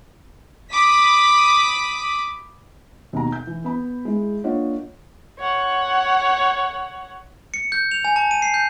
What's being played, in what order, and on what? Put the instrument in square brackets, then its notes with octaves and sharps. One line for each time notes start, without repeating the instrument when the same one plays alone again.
[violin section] B5 D6 D#6 B6
[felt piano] D#2 B2 A#5
G6
E3
B3 B5
G#3 E4
A#3 D4 F4 C#5 D#5 F#5
[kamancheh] C#5 F#5
[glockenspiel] C#7
G6
F7
G#5
A5
D#7
C7
G6